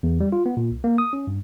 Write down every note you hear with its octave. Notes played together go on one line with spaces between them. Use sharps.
E2
G3
F4
B3
A#2
C2
A#3
D#6
C#4
G2